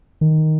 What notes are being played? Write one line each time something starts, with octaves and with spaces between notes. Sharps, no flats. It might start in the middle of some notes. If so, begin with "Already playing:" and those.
D#3